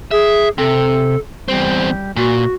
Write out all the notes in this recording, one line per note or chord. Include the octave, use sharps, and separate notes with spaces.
G#4 E5
C3 A4
E2 G3 C4
A#2 F#4